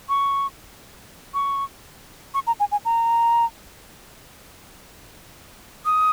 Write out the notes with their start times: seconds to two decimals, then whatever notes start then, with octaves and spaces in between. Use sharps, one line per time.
0.09 C#6
1.34 C#6
2.34 C#6
2.47 A#5
2.60 G#5
2.72 G#5
2.85 A#5
5.86 D#6